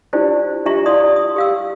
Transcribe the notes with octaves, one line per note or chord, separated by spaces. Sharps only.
D4 E4 F4 G4 C5 D5
D4 F4 G4 E5 A#5 C#6
E4 D5 F5 C6 D#6
D#6
G4 F5 E6